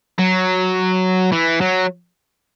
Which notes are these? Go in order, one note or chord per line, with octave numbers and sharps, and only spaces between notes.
F#3
E3
F#3